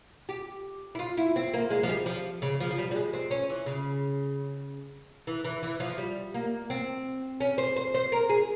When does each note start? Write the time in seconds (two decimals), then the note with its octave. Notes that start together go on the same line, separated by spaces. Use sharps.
0.29 G4
0.95 E4
0.99 F4
1.17 E4
1.36 C4
1.54 A#3
1.70 G#3
1.83 F3
1.89 G3
2.06 F3
2.42 C#3
2.60 F3
2.71 F3
2.78 G3
2.91 G3
2.95 G#3
3.13 C4
3.31 C#4
3.50 E3
3.66 C#3
5.27 E3
5.45 E3
5.63 E3
5.80 F3
5.98 G3
6.34 A#3
6.70 C4
7.40 C#4
7.58 C5
7.76 C5
7.94 C5
8.12 A#4
8.29 G#4